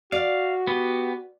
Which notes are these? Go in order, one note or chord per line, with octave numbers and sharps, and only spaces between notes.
F#4 D5 F5
B3 G4